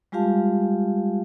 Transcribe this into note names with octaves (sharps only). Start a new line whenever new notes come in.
G3 G#3 F4 G4 F5 A5